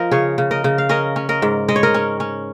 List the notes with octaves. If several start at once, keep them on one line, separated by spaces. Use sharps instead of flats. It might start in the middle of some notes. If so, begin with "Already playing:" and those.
Already playing: F3 A#4 D#5
C#3 G#4 C#5
C#3
A#4 D#5
C#3
F5
C#4 A#4 D#5
C#4
A#4 D#5
G#2
G#3 D#5
C#5
A#4 D#5
C#4
C#4